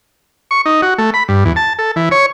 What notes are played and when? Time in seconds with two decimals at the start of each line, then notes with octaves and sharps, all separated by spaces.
0.51 C#6
0.66 D#4
0.82 F#4
0.98 A3
1.14 B5
1.29 G2
1.45 E2
1.56 A5
1.79 A4
1.96 E3
2.11 C#5